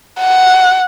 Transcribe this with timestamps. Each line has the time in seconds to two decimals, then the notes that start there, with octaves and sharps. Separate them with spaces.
0.20 F#5